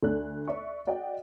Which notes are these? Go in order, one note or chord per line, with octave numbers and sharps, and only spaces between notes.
D2 A3 D4 F#6
D5 E5 C#6
F#4 D5 D#5 F#5 G5